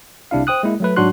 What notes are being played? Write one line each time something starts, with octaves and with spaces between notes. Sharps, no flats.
C2 C3 D4 E4 F5
C5 G5 D#6 F#6
G#3 A#3 E4
F#3 A3 B4
G#2 F#3 D4 F#4 C6 F#6